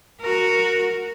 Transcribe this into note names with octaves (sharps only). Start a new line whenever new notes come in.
F#4 A#4